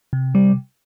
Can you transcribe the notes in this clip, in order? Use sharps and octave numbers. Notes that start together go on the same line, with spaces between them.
C3
G3